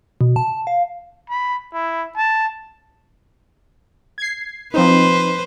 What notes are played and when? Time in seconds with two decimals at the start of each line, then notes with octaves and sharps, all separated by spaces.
0.21 B2
0.36 A5
0.67 F5
1.29 B5
1.73 E4
2.17 A5
4.18 G#6 C7
4.74 F3 C4 D#4 B4 C5